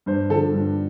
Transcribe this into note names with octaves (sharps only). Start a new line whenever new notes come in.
G2 C5
D3 F3 A4
G2